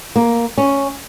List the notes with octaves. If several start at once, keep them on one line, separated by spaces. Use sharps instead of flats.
A#3
C#4